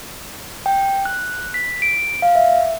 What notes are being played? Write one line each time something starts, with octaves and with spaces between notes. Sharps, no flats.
G5
F#6
B6
D7
F5
E5